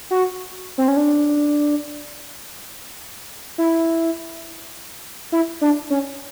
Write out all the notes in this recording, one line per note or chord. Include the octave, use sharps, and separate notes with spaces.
F#4
C4
C#4
D4
E4
E4
D4
C#4